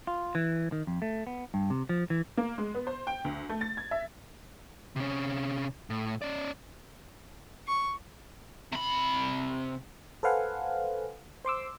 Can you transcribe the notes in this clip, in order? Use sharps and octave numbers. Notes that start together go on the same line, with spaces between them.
F4
E3
D#3
F2
A3
B3
G2
C3
F3
E3
A#3
G#3
B3
C5
G5
D2
A3
A6
G#6
E5
C3 C#4
A2
C#4 D5
C#6
C3 B5
A4 B4 C5 F5 F#5 G#5
C5 C6 D6 E6